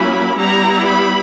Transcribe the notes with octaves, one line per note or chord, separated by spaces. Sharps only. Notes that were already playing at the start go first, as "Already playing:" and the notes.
Already playing: F#3 A#3 C#4 E4 B5
G3 B3 E4 A#5
B5